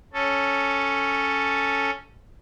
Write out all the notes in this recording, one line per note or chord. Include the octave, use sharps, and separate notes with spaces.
C#4 A4